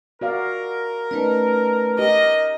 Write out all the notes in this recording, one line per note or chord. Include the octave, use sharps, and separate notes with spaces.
F#4 A#4 D5 F5
A3 C#4 D#4 B4 D5
G4 D#5